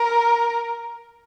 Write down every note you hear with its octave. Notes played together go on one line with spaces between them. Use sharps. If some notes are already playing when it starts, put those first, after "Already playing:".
Already playing: A#4